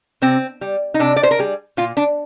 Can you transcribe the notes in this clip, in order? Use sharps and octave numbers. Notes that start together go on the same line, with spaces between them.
C3 C4
G3
D#4
C3 D4
D5
C5
A#4
G3 G#4
A#2 F4
D4